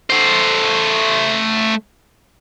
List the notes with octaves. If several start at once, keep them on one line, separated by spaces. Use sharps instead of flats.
A3 C5